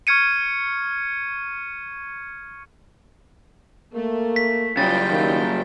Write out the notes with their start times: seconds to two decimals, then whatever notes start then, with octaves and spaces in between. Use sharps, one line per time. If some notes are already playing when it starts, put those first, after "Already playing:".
0.07 C#6 F6 G#6 C#7 D#7
3.94 A3 A#3
4.36 B6
4.77 F#2 C#3 G3 F4 G5 A6
5.09 D#3